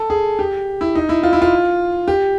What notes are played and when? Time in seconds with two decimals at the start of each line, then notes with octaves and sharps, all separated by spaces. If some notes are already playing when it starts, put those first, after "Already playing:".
Already playing: A4
0.10 G#4
0.39 G4
0.81 E4
0.95 D#4
1.09 E4
1.23 F4
1.33 E4
1.42 F4
2.08 G4